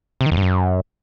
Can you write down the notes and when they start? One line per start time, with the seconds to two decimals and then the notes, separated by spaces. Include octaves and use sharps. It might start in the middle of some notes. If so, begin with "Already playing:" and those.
0.21 C3
0.26 D#3
0.32 E2
0.37 G2
0.42 F#2